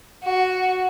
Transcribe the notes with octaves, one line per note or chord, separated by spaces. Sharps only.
F#4